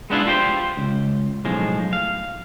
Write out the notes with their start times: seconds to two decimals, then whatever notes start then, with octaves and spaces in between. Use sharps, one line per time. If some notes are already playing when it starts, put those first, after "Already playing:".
0.10 G#3 B3 D4 E4 F4
0.27 F4 G4 C5
0.77 C#2
1.45 B1 A2 F3 G#3
1.93 F5